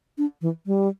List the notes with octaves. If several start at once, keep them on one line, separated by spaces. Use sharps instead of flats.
D4
E3
G3